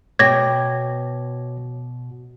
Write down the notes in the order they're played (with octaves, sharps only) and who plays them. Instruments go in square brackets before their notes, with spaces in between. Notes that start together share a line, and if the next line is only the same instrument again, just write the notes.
[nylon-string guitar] B2 B3 G5 [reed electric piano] C#5 D6 [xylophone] G#6 A#6